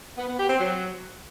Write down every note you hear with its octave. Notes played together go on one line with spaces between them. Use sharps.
B3
B3
G4
C4
F#3